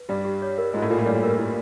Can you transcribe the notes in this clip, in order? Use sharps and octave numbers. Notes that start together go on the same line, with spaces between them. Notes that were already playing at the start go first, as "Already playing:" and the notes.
Already playing: B4
G2 G3 G4
G4
C#5
A#4
G#2 G#3 F4
A2 A3
A#2 A#3 F4
A2 A3
G2 G3 C#5
A#4
E4